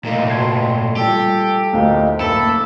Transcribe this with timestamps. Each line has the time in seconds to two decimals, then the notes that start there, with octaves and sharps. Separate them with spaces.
0.05 A#2 A3 A#3 D#4
0.29 B2 A5 C6 G#6 C7
0.97 F3 G3 G4 A4
1.73 D2 F3 A3 A#3 D#4 F5
2.20 F#1 A#3 A4 B5 E6